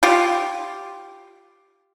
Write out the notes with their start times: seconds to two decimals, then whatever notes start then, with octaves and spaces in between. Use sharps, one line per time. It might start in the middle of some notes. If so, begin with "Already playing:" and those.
0.03 F4 G4